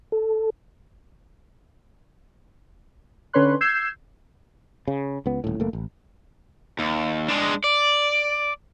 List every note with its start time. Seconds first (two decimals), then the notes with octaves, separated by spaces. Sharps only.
0.12 A4
3.33 D3 C#4 B4 C#5 C6 F#6
3.61 E6 G6 G#6 C7 E7
4.88 C#3
5.26 C#2 B3
5.44 D#1 A2
5.60 F#1 A3 A#3
5.73 A1
6.79 D#2
7.28 G#3 D4
7.64 D5